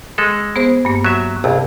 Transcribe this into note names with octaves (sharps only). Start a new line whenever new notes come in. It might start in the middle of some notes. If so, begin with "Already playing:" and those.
G#3 A4
B3 G#4 C5
G2 A#3
F#3 E5
A#1 F2 C3